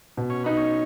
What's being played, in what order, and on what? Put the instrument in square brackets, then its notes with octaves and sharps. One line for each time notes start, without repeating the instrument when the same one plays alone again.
[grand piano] B2
[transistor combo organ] C#4
[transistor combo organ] B3 [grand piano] D#4
[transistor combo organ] C#4